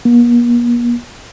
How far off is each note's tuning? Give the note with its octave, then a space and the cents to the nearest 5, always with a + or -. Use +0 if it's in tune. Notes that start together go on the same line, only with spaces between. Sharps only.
A#3 +45